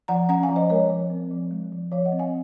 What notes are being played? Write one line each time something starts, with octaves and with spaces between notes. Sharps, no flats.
F3 F#5 A#5
C#4 F#5 A#5
F5 G#5
F3
C5 D#5
G#3 A#4 C#5
F3
C4
F3
G#3
F3
F3 C#5 F5
D#5 F#5
C4
F5 G#5